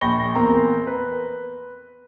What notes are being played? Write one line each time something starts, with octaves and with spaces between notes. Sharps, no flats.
A#1 G5 B5 C#6 A#6 G7
E2 A#3 C4 A#5
B4